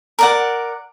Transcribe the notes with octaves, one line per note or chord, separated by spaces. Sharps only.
A#4 D5 F#5